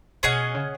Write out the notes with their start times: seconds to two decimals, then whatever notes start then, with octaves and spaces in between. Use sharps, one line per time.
0.23 B2 C#4 G#4 D#5 F#5
0.54 C#3